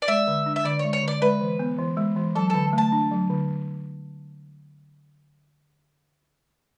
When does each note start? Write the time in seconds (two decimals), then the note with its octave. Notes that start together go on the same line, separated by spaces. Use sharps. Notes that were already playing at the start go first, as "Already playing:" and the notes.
0.02 D5
0.08 G#3 E5
0.27 D3
0.46 D4
0.56 E5
0.65 D3 D5
0.79 C#5
0.84 G#3
0.93 C#5
1.03 D3 D5
1.22 G#3 B4
1.41 E3
1.59 B3
1.78 E3
1.97 G#3
2.16 E3
2.35 F#3 A4
2.50 D3 A4
2.73 A3 A5
2.92 D4
3.11 F#3
3.30 D3